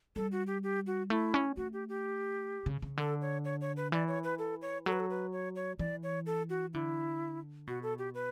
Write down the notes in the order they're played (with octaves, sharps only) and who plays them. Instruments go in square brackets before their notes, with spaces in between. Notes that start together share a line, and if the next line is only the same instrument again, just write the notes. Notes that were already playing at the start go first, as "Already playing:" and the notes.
[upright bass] G3 [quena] A4
[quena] F#4
G4
G4
F#4
[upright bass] A3 [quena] E4
[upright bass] C#4
[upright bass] A3 [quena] F#4
[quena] G4
G4
[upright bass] C#3
C#3
[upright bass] D3 [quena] A4
[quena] C#5
C#5
C#5
B4
[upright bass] E3 [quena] D5
[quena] C#5
B4
A4
C#5
[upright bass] F#3 [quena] A4
[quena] B4
A4
B4
C#5
C#5
[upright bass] E3 [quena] D5
[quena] C#5
A4
F#4
[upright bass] D3 [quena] E4
[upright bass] B2 [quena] F#4
[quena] A4
G4
B4